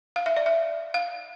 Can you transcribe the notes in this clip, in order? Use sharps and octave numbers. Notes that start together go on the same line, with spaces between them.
F5
E5
D5
E5
F5